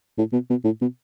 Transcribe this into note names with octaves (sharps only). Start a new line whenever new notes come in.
A2
B2
B2
A2
B2